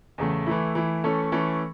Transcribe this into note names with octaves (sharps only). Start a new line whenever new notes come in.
E2 C#3 A3
E3 A3 E4
E3 A3 E4
E3 A3 C#4 A4
E3 A3 C#4 A4